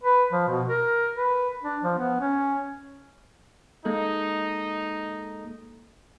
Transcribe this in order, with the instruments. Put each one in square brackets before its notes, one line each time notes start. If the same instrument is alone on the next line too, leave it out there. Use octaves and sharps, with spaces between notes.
[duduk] B4
F3
B2
A#4
B4
D4
F3
B3
C#4
[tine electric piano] G#3 A#3 A4 [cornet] D#4